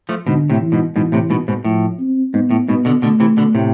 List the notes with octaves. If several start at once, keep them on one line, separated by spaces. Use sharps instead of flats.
F3 A3
G#2 B2 D3
A2 C3
E3
G#2 B2
G#2 B2 E3
A2 C3
G#2 B2
G#2 B2
A2 F3
C4
G#2 B3
A2
G#2 B2 B3
B2 D3
B2 D3 A3
C3 E3
B2 D3
A2 C3